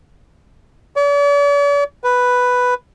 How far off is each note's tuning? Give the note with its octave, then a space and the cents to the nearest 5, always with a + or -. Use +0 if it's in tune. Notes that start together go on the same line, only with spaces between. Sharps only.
D5 -45
B4 +0